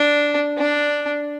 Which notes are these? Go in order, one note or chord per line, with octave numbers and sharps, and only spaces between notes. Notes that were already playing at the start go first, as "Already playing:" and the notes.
Already playing: D4
D4